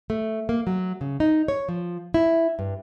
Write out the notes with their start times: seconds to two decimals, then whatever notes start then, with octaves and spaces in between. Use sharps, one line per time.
0.10 A3
0.49 A#3
0.67 F#3
1.01 C#3
1.20 D#4
1.48 C#5
1.69 F3
2.14 E4
2.59 G2